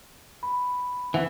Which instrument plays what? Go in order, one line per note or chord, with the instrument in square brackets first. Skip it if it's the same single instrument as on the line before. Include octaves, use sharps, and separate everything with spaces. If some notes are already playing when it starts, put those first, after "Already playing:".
[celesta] B5
[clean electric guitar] E3 [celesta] F#5